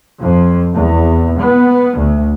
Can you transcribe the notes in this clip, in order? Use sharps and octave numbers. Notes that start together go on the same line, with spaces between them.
F2
E2
B3
D2